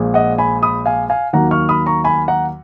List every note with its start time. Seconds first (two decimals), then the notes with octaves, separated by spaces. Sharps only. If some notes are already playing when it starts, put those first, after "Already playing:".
Already playing: A#1 A#2 G#3
0.14 D#5 F#5
0.38 G#5 B5
0.62 B5 D#6
0.86 F5 G#5
1.10 F5 G#5
1.33 D#2 D#3 F#3 A#3 F#5 A#5
1.51 C#6 F6
1.69 B5 D#6
1.86 A#5 C#6
2.04 G#5 B5
2.28 F#5 A#5